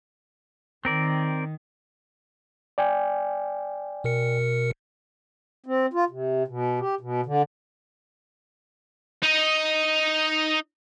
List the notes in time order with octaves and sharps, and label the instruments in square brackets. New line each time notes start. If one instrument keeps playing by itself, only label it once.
[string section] D#3 [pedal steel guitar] C4 A#4 D5
[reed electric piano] D5 G5 G#5
[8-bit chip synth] B2 A#4 C#7
[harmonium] C4
F4
C3
B2
G4
B2
D3
[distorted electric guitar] D#4 D#5